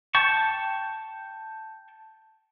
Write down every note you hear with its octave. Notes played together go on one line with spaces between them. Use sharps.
G5 A5 C#6